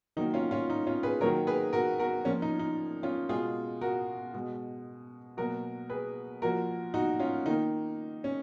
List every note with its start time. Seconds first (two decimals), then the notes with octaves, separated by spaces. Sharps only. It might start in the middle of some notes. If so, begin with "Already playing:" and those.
0.17 D#3 F#3 A#3 D#4
0.34 C#4 F4
0.51 C#4 F4
0.70 D#4
0.87 C#4 F4
1.03 G#4 B4
1.21 D#3 F#3 A#3 A#4 C#5
1.47 G#4 B4
1.73 F#4 A#4
1.99 F#4 A#4
2.25 A#2 F3 A#3 C#4
2.42 D#4
2.59 D#4
3.03 C#4 F4
3.29 B2 G#3 F4 G#4
3.81 F#4 A#4
4.34 B2 G#3
5.37 B2 F#3 A#3 F#4 A#4
5.90 G#4 B4
6.42 A#2 F3 A#3 F#4 A#4
6.94 D#4 F#4
7.20 C#4 F4
7.46 D#3 A#3 D#4
8.24 C#4